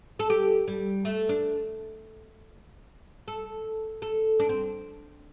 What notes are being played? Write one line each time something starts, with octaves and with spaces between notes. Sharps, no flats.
A4
G4
G3
A3
D4
A4
A4
D4
C4